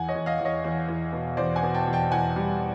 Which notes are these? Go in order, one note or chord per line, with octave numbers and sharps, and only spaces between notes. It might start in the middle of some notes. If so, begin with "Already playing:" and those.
Already playing: E2 F#5 G#5
C#5 D#5
E2
D#5 F5
E2
C#5 D#5
E2
E2
B2
E2 C5 D5
F#5 G#5
B2
G5 A5
E2
G5 A5
E2 F#5 G#5
G3